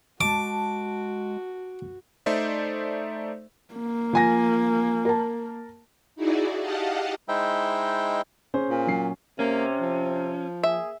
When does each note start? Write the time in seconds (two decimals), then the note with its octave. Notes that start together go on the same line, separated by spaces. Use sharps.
0.21 G#3 F#4 A5 D6
2.26 A3 D#4 C5 D5 E5
3.74 A#3
4.13 F3 G#5 A#6
5.05 A#4 A5
6.16 D#4 E4 F#4 G#4 D5
6.59 G4 D#5 F5 F#5 A5
7.28 G#3 D#4 E4 C5 E5 G5
8.54 C#4 G#4 C5
8.69 A#2
8.87 F#3 C#4 C7
9.39 C3 A#3 C#4
9.81 F3
10.63 A#3 G#4 E5